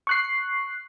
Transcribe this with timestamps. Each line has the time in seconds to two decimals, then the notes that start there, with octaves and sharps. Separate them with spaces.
0.07 C#6 F#6 C7